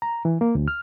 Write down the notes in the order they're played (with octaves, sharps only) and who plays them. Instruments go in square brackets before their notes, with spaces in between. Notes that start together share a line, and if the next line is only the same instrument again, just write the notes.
[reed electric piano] A#5
E3
A#3
D2
F6